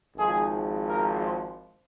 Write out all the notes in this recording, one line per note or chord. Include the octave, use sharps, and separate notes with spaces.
G#1 G#2 F3 G#3 G#4
A#4
C5